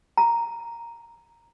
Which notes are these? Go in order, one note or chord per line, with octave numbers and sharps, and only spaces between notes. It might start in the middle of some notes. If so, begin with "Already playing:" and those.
A#5